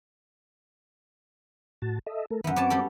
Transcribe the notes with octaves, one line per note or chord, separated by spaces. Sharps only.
A2 F#4 A5
A4 D#5 E5
A3 A4 A#4
F#2 D#3 B3 E5
B3 C4 C#5 A5 D6
G3 G4 A4